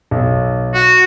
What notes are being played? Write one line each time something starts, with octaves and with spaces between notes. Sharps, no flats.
B1
F#4